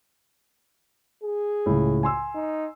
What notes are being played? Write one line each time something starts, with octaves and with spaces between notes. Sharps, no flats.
G#4
C#2 A2
G#5 C6 E6
D#4